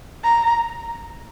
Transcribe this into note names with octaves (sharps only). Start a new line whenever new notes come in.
A#5